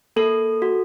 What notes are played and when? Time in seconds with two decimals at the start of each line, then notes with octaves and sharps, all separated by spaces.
0.16 A#3 A4
0.62 F#4